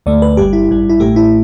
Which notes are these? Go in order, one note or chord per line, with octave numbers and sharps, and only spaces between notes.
D2 D3 A3 D5
B4
G1 G2 G3 G4
E4
A1 G2 G3
E4
A1 A2 A3 G4
E4